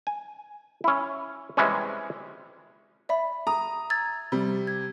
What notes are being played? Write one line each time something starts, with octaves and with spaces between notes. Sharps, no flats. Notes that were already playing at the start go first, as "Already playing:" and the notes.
G#5
C#4 E4
C3 E3 G3 G#3 C#4
D5 E5 B5
A#5 D#6
E6 G#6 A6
C3 G3
G#6